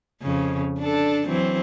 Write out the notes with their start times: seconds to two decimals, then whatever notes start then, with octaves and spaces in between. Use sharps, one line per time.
0.22 F2 C#3
0.80 D4 A4
1.27 E3 F#3 C4